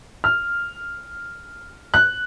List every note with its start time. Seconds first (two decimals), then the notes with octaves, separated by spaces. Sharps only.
0.24 F6
1.94 F#6